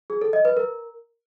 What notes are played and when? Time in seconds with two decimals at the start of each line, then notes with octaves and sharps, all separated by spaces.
0.10 G#4
0.21 A4
0.33 D#5
0.45 B4
0.57 A#4